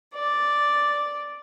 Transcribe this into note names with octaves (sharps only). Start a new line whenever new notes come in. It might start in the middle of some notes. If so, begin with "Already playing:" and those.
D5